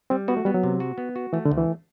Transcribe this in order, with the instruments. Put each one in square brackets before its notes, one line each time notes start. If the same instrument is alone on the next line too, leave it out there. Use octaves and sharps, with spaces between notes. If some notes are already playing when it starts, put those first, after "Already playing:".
[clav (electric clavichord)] G3 [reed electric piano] C4
[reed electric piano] B3 [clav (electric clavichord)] F#4
[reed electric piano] A3
[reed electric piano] G3 [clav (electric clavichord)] B3
[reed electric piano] F#3
[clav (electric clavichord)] C3
F#4
B3
F#4
[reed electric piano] E3 [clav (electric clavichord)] A3
[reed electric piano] D3
[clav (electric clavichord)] D2
[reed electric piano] E3